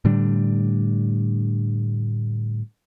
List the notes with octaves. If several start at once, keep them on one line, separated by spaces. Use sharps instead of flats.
A2 D3 G3 D4